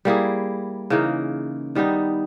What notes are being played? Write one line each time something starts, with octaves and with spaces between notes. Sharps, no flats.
G3 A#3 E4 G#4
C#3 E3 A#3 D#4
D#3 G3 B3 D#4